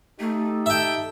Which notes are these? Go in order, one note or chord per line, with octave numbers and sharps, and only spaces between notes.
A3 D#4 G4 A4
E5 G5